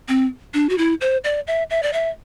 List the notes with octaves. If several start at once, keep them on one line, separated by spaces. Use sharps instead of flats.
C4
D4
F#4
E4
C5
D5
E5
E5
D5
E5